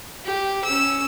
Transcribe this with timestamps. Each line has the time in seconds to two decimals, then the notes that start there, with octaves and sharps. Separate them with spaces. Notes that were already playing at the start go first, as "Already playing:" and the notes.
0.25 G4
0.65 C#4 E6